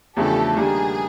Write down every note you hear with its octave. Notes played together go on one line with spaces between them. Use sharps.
E2 C#3 F3 A3 D4 G4 A4
D#3 G3 A#3 D4 G#4